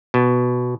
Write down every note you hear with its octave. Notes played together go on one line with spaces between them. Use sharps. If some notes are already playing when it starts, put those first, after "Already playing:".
B2